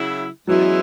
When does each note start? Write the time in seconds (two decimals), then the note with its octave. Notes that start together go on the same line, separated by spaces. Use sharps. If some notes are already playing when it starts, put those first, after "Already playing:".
Already playing: C#3 F#3 E4
0.47 E2 E3 F#3 G#3 C#4 E4